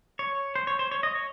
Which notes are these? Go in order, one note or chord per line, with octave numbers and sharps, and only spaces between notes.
C#5
C5
C#5
C5
C#5
D#5
C#5